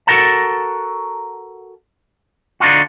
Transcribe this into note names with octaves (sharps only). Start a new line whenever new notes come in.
F#4 A4 A#4 F#5 A5
D3 D4 D#4 F4 F#4